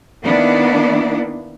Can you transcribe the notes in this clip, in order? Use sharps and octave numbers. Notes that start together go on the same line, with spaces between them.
D#3 A#3 B3 D4 E4